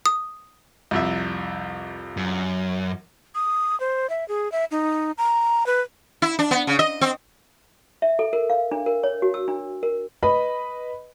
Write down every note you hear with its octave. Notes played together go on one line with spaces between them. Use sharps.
D#6
C2 F2 E5
F#2
D#6
C5
E5
G#4
E5
D#4
A#5
B4
E4
D4
B3
C#3
D#5
C4
E5
A4
A#4
F5
D4
A#4
C#5
F#4
E6
D4
A#4
B4 D#5 B5